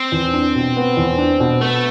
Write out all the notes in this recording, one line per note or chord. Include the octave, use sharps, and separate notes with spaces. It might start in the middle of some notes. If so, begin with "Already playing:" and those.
Already playing: C4
E2
D4
B2
B3
E2
D4
B2
A3 B3